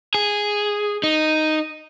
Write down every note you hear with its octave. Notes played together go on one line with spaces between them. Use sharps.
G#4
D#4